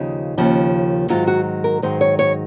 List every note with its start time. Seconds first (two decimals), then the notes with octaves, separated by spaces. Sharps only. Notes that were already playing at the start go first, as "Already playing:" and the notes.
Already playing: D#2 C#3 F3 D#4
0.37 D#2 C#3 F3
1.10 G#2 D#3 F#3 F4
1.27 F#4
1.64 A#4
1.82 G#2 D#3 F#3 C5
2.01 C#5
2.19 C#5